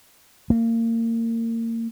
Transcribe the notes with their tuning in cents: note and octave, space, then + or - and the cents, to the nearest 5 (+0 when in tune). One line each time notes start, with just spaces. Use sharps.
A#3 -30